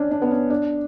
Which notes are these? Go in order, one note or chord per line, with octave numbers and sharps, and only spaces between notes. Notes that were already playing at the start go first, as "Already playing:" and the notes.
Already playing: C#4 D4
D4
B3
C#4
D4